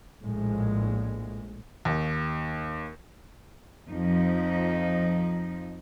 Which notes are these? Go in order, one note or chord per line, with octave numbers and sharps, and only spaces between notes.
A#1 A2 G#3
D#2
F2 F3 D#4